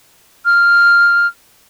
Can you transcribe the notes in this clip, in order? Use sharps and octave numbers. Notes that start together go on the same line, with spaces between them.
F6